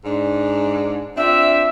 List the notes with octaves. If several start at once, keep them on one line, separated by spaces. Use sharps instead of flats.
G#2 D4
C4 D4 F4 E5